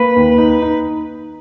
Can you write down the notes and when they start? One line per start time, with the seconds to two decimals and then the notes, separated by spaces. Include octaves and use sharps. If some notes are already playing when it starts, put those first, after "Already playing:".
Already playing: A#3 B4
0.16 D#2
0.38 D#4
0.62 D#4